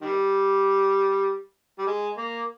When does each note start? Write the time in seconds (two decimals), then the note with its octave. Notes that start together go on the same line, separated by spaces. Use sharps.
0.02 D#3 G3
1.79 G3
1.87 G#3
2.18 A#3